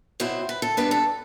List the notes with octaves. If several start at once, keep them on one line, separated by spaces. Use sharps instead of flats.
B2 F#3 C4 E4 C5
B4
A4
C3 G3 B3 D4 B4
A4